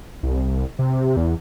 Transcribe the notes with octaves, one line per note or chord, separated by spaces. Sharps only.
C2
C3
E2